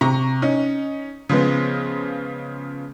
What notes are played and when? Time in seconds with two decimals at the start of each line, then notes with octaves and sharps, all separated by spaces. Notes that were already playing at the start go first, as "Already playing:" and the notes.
0.01 C3 A#5 C#6
0.42 C#4 D#4
1.29 C#3 F3 G#3 B3